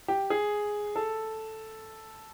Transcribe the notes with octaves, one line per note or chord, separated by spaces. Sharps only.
G4
G#4
A4